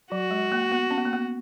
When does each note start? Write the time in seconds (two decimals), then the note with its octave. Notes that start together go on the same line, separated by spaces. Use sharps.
0.12 F#3 F#4
0.31 G#3
0.52 A#3
0.72 B3
0.91 C#4
0.98 B3
1.05 A#3
1.13 B3